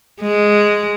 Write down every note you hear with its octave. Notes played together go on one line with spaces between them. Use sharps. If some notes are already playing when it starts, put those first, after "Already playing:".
G#3